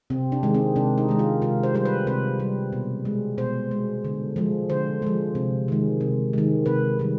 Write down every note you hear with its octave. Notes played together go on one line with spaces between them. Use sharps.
C3 C4
D4
D#3 G#3
C4
C3 D4
D#4
D#3 G#3
F4
C3 F4
C5
G3 C5
B4
C3 B4
G3
B2
G#3
B2 C5
G#3
D3
F3 G#3
D3 C5
F3 G#3
C3
D#3 G#3
C3
D#3 G#3
C3 B4
D#3 G3